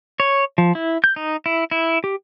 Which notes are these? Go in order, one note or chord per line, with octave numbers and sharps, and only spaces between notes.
C#5
F3
E4
G6
D#4
E4
E4
G4